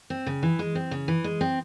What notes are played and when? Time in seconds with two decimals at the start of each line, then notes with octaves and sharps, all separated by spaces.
0.10 C4
0.27 C#3
0.43 E3
0.59 G#3
0.75 C4
0.91 C#3
1.08 E3
1.24 G#3
1.41 C4